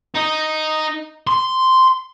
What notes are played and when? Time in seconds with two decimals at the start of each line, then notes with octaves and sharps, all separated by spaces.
0.14 D#4
1.27 C6